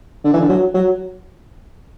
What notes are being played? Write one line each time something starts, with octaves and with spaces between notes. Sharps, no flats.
D3
E3
D3
F#3
F#3